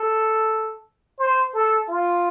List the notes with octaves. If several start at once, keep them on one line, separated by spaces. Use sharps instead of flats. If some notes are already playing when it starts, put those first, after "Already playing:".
Already playing: A4
C5
A4
F4